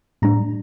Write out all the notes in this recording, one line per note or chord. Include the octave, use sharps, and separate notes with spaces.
A2 G3 D4 A#5